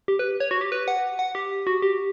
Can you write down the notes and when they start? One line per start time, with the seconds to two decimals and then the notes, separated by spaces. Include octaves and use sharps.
0.08 G4
0.19 B4
0.40 C#5
0.51 F#4
0.61 G4
0.72 B4
0.88 F#5
1.19 F#5
1.35 G4
1.67 F#4
1.82 G4